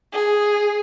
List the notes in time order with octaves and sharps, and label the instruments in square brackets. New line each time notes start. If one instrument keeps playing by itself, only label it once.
[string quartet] G#4